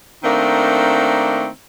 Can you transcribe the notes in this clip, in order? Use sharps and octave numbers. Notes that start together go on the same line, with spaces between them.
D#3 A3 A#3 C4 D4